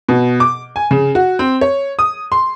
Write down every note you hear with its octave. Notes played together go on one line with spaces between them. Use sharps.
B2
D6
G#5
C#3
F#4
C4
C#5
D#6
C6